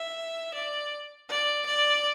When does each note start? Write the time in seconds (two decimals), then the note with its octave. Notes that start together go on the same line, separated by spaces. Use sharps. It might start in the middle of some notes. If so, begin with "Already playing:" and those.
Already playing: E5
0.54 D5
1.29 D5
1.66 D5